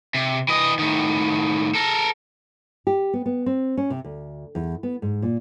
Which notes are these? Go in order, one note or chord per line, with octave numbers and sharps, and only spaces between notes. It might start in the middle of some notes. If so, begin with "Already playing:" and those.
C3
E3 D#5
A2 D#3
A4 A#4
G4
B3
B3
C4
C#4
C3
D2
E2
B3
G#2
A#2